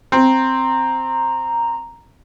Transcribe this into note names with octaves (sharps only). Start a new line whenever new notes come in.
C4 A#5